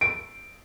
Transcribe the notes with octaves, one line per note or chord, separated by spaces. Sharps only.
D7